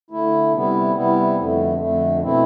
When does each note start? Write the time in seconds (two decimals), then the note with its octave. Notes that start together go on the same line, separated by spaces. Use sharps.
0.10 D3 A3 E4
0.53 C3 G3 B3 E4
0.95 C3 G3 B3 E4
1.37 F2 D3 A3
1.79 F2 D3 A3
2.21 B2 A3 C4 E4